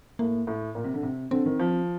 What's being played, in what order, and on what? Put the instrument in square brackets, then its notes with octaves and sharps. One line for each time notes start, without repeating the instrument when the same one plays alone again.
[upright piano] A2 [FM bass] A#3
[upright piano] A2
A#2
C3
D3
C3
[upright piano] D3 [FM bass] C4
[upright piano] D#3
F3